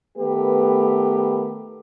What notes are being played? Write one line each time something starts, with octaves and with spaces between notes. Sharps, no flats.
D#3 A3 B3 G4 B4